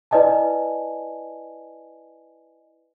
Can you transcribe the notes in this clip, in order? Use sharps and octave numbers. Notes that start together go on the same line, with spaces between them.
E4 B4 D5 D#5 G#5 A5